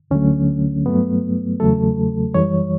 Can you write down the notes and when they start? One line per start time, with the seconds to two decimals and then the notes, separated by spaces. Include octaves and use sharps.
0.11 D2 D3 F#3 A3 C#4
0.86 G2 F#3 A3 B3
1.60 E2 C#3 F#3 A3 A4
2.34 F#2 E3 G3 C#5